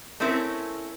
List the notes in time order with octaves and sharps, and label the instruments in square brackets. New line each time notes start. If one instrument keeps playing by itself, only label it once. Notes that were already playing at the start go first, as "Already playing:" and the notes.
[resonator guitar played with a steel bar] A3 C4 C#4 E4 A#4